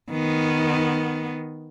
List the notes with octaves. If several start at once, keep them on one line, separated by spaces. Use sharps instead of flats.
D#3 B3